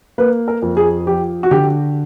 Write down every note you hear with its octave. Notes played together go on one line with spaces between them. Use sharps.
A#3 B4
A#4
F2
G#4
F3 G4
F#4
D3 G4